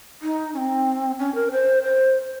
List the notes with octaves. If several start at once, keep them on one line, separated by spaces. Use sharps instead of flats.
D#4
C#4
C4
C#4
A#4
C5
C5